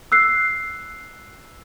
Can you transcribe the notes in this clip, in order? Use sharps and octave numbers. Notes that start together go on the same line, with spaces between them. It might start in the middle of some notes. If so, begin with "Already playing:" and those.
E6 F#6 C7